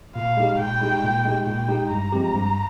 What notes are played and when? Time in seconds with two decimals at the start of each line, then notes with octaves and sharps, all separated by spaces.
0.15 A#2 F5
0.37 G#3 D#4 G4
0.59 A#2 G5
0.81 G#3 D#4 G4
1.04 A#2
1.25 G#3 D#4 G4
1.47 A#2 G5
1.68 G#3 D#4 G4
1.90 G2 A#5
2.12 F3 G#3 C4 G4
2.34 G2